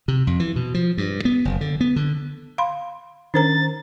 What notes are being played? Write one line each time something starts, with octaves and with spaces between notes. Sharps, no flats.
C3
F2
E3
B2
F3
G2
B3
F#1
D3
B3
D3
F5 B5 C6
D#3 C#4 D4 A#4 C5 A#5 A6